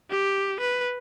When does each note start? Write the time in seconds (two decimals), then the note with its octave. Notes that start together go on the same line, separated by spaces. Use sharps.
0.11 G4
0.60 B4